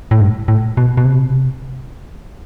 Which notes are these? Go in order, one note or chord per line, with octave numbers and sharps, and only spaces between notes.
A2
G2
A2
B2
B2
C3